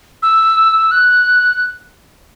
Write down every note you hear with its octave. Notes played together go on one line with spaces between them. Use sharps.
E6
F#6